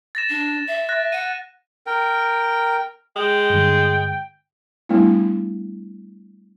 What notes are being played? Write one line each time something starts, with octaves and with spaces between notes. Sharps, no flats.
A6 A#6 E7
D4
E5
F#6 A6 A#6
F#5 D#7
A#4 G5
G#3 G5
G2 D3
G3 A3 B3 D4 E4